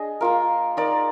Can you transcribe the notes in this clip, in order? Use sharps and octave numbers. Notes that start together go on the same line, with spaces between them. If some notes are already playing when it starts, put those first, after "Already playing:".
Already playing: D4 G#4 D#5
A#3 F4 A#4
D#4 A#4 D5